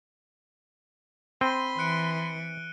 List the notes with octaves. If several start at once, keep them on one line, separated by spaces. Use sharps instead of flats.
C4 B5 C6 D#7 G7
E3 F#6 C#7 D7